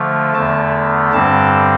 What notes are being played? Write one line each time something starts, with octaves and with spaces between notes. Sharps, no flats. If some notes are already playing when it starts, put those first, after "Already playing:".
Already playing: D3 F3 A3
E2 D3 A3 A5
G2 D3 G3 C4 A5